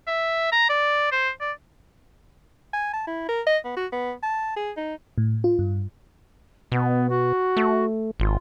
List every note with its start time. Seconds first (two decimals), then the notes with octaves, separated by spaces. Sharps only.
0.07 E5
0.52 A#5
0.69 D5
1.12 C5
1.40 D5
2.73 G#5
2.93 A5
3.07 E4
3.28 A#4
3.47 D#5
3.65 B3
3.77 F#4
3.92 B3
4.23 A5
4.56 G#4
4.77 D#4
5.18 A2
5.44 F4
5.59 G2
6.72 B2 B3
7.09 F#4
7.57 A3
8.20 G#1 F4